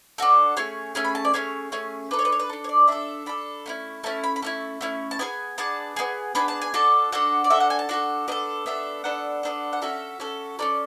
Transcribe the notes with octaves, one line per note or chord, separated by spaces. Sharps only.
D4 F#4 A4
A3 C#4 G#4 C#5
A3 C#4 G#4
B5
A5
D5
A3 C#4 G#4 C#5
A3 C#4 G#4
D4 A4 B4
C#5
B4
C#5
B4
D4 A4
C#5
D5
D4 A4 E5
D4 A4 B5
A3 C#4 E4
A3 C#4 E4 A5
B5
B5
A3 C#4 E4 A5
A3 C#4 E4
A5
B3 D4 G#4 G#5
B3 D4 G#4 A5
B3 D4 G#4
B3 D4 G#4 B5
A5
G#5
D4 F#4 A4 A5
D4 F#4 A4 F#5
D5
D4 F#4 A4 E5
F#5
G#5
A5
D4 F#4 A4 F#5
B3 D4 A4 D5
B3 D4 A4 E5
B3 D4 A4 F#5
B3 D4 A4
F#5
C#4 F#4 A4 E5
C#4 F#4 A4
C#4 F#4 A4 D5